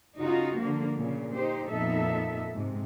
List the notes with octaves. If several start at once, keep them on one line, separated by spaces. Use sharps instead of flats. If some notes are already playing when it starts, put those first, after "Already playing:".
C#3 D#4 F4 F#4
D3 F3 A#3
A#2 C#3
D#4 G4 C5
F2 A#2 B3 D#4 A4 E5
G#2 C3